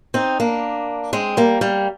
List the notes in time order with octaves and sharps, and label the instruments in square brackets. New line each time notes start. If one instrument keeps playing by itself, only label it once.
[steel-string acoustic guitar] C4 D#4
A#3 D4
G#3 C4
G3 A#3
G3 A#3